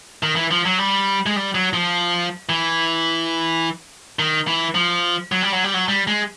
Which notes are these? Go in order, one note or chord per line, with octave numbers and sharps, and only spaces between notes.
D#3
E3
F3
F#3
G3
G#3
G3
F#3
F3
E3
D#3
E3
F3
F#3
G3
F#3
G3
F#3
G3
G#3